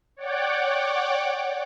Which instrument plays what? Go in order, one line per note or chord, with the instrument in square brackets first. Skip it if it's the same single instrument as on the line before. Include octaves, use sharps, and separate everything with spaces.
[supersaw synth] C#5 D5 F#5 G5 D6